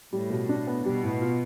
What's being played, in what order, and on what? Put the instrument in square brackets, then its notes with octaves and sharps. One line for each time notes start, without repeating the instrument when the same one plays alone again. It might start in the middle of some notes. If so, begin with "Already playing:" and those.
[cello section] A2 [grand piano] G3
[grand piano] B2
D4
B3
[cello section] B2 [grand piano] G3
[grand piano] A2
F4